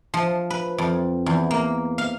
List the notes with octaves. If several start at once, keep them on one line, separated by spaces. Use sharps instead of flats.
F3
B4
F2
E2
A#3
F5